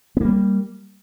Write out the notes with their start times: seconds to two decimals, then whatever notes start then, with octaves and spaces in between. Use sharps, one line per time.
0.17 B3
0.21 A#3
0.25 G3